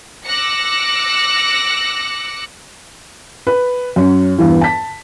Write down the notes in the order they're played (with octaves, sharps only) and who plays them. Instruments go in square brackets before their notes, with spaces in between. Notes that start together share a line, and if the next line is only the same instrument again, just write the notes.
[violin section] D6 E6 F#6 A#6 C#7
[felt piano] B4
F#2 C#4
E2 G2 E3
A5 B6